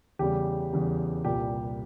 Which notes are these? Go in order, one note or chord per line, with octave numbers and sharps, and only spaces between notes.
E2 C#3 G3 G4
E2 C#3 G3
C2 A#2 G3 G4